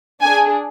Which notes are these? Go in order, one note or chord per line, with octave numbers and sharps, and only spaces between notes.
D4 G#4 G#5